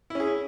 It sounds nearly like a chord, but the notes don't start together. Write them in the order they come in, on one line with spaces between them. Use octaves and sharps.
E4 C#4 G#4